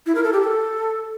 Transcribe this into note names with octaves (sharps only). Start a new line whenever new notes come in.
E4
A#4
A4
G4
A4